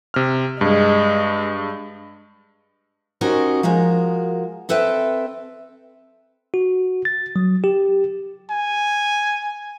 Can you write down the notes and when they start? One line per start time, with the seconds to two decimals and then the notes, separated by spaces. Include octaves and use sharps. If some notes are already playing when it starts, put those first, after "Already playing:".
0.14 C3 F6
0.61 G2 G#3
3.21 C#4 D#4 F#4 G4 A#4 C5
3.63 F3 G#3 F#4 A#4
4.69 C4 A4 B4 E5 G5
6.54 F#4
7.05 A6
7.36 F#3
7.64 G4
8.50 G#5